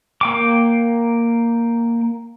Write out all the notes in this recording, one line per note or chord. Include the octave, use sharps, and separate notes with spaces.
A#3 G5 D6